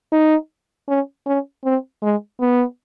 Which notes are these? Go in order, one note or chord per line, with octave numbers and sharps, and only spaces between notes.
D#4
C#4
C#4
C4
G#3
B3